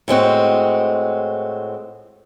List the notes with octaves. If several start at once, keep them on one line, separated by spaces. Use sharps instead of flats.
A2 G#3 C4 F#4